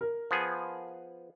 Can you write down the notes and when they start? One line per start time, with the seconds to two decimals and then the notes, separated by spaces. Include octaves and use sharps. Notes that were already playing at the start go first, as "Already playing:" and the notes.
0.01 A#4
0.31 F3 B3 G#4